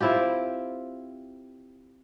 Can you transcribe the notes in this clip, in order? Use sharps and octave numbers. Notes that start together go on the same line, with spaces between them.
C4 E4 F4 G4